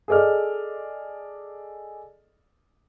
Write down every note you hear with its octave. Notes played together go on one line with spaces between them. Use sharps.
G#4 A4 D5 D#5 F6